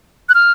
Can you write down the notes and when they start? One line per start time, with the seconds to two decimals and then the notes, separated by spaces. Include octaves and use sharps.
0.29 F#6
0.35 F6